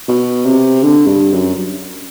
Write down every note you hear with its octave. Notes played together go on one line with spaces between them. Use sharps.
B2
C3
D3
G2
F#2